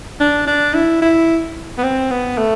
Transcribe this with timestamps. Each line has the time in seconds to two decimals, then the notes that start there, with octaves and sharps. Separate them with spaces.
0.20 D4
0.47 D4
0.74 E4
1.02 E4
1.78 B3
1.83 C4
2.10 B3
2.38 A3